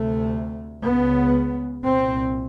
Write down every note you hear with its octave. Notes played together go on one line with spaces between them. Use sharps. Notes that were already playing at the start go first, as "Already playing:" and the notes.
Already playing: D2 C3 A3
C#2 C#3 B3
C2 A#2 C4